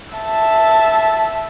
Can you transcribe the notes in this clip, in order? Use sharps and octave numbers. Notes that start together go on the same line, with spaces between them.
E5 A5